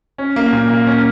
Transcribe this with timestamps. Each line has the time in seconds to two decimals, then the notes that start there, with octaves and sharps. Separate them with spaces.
0.18 C#4
0.36 A#3
0.52 A#2
0.69 A#3
0.87 C#4